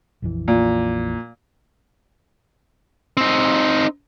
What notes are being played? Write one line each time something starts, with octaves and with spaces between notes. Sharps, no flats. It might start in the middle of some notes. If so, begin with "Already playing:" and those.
A#1 F2 E3
A#2
C4 D#4